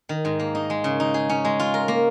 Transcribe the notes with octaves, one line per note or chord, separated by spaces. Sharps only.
D#3
G#2
A#3
D#4
G#3
C#3
D#4
G#4
C#4
G#3
F4
A#4
A#3